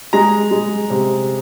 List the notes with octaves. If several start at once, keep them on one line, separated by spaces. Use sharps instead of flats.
G#3 A#5
G#3
C3